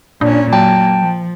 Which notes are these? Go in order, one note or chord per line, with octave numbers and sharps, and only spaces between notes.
A#2 C#4 D4
F#3 A#3 G5 A5
F3